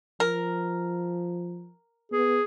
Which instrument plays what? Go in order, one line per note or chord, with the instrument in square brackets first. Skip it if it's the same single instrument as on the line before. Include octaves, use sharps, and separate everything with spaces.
[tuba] F3 [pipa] A#4
[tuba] B3 [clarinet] G#4